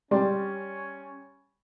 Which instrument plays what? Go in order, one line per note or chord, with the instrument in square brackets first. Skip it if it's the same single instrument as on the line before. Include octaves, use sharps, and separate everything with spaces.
[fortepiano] G3 D5 C6 [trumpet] C#4